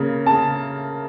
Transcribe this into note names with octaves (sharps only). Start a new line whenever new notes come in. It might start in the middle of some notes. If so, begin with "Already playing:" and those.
Already playing: C#3 A#3
C#3 A5